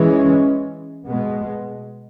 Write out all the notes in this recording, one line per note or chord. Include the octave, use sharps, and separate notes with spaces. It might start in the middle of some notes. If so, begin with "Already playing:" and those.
Already playing: E3 G#3 C#4
B2 G#3 B3